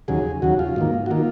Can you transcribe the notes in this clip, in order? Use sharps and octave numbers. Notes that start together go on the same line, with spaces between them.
D#2 C#3 F#3 G#4
D#2 C#3 F#3 F#4
F4
G#2 D#3 A#3
F#4
D#3 A#3 F4